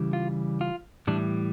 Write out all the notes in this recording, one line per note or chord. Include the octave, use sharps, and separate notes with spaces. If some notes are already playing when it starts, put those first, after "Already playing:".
Already playing: C#3 E3 G3
F4
F4
A2 E3 G3 D4